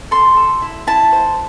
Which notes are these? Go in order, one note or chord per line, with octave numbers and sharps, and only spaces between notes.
A4 C6
A4
E4
E4 A5
C5